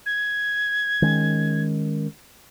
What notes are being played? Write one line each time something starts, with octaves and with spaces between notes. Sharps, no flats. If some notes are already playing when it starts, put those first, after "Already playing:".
G#6
D#3 G#3 C#4